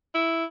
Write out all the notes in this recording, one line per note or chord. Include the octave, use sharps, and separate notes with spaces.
E4